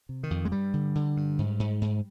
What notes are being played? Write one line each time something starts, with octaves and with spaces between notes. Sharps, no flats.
C3
D#3
F2
G#3
G2 G3
D3
D3
G2
G#2
G#2
G#2